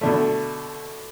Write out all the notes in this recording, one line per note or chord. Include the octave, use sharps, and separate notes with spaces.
B2 D3 A3